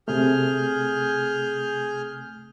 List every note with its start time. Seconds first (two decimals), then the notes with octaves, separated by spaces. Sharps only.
0.08 C3 A3 G#4 F6 G6